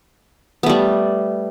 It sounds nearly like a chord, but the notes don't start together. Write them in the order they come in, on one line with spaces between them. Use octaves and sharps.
B3 A3 G3